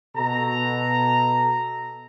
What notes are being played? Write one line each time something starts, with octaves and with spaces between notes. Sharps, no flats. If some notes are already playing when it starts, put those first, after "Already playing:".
B2 A4 A#5